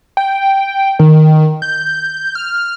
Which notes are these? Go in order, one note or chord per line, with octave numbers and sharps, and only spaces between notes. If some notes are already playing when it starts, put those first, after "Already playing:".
G5
D#3
G6
F6